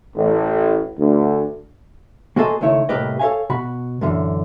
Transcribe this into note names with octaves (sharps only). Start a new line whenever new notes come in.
A1
D2
A#3 F#4 G#4 A4 C5 D#5
C#2 D#3 A3 E4 C#5
C2 A2 A#3 G4 B4 D#5
A4 C#5 E5 F5 G#5
B2 F#4 B5
F#2 A#2 D3 E3